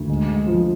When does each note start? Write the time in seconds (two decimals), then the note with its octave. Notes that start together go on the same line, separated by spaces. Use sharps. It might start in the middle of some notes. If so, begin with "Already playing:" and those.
Already playing: D2
0.10 G#3
0.27 G#3
0.47 F3